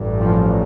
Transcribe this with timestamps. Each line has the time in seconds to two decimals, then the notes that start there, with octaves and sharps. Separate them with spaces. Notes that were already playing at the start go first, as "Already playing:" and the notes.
Already playing: A1 G2
0.21 F3